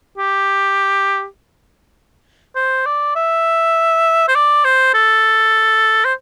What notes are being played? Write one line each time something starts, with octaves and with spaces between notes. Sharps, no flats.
G4
C5
D5
E5
C5
D5
C5
A4
C5